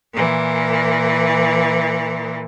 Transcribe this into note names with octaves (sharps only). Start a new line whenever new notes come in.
A#2 E3